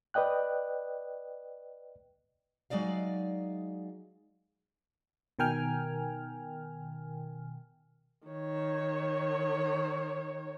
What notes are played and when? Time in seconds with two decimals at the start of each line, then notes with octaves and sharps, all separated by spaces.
0.14 B4 D5 D#5 G5 F#6
2.70 F#3 G#3 D#4 D5 F5
5.39 B2 D#3 A#4 G5 G#5 F6
8.27 D#3 C#5